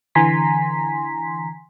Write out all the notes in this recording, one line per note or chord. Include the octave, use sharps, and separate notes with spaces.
D3 E3 G#5 A#5 C6 B6